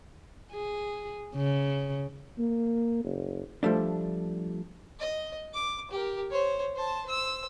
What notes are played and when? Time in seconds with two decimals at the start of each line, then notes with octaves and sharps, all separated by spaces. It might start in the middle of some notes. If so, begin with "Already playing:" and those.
0.51 G#4
1.35 C#3
2.38 A#3
3.04 F#1
3.63 F3 G3 A3 D4
4.99 D#5
5.54 D6
5.91 G4 A#4
6.30 C5 C#5
6.75 C5 A5
7.05 C5 E6